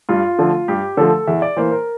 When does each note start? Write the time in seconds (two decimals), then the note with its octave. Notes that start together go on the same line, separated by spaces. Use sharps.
0.09 G2 F4
0.39 D3 F3 A3
0.68 G2 G4
0.97 D3 F3 A3 A4
1.27 E2 E5
1.42 D5
1.57 E3 A#3 C5
1.71 A#4